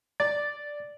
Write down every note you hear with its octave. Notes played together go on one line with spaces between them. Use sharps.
D5 A6